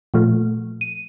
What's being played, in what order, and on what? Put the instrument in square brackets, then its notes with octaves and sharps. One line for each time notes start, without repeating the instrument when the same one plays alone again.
[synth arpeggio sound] A#2 F3 A3
D#7